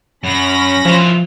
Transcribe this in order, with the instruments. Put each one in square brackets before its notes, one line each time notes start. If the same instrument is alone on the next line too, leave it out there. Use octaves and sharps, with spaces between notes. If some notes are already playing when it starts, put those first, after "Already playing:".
[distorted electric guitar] F#2 [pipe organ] C#4 B5 A#6
[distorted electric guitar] E3 F4 [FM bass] F3